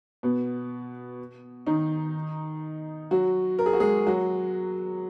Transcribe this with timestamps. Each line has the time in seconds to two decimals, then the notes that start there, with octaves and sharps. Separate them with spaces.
0.23 B2 B3
1.66 D#3 D#4
3.11 F#3 F#4
3.59 A#4
3.66 G#4
3.73 F#4
3.80 G#3 G#4
4.07 F#3 F#4